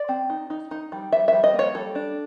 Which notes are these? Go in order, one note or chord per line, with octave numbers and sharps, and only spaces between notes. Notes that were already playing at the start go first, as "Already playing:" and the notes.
Already playing: D5
C4
D#4
D#4
D#4
G3
G3 E5
G3 E5
D#5
A#3
C#5
G3 A4
D4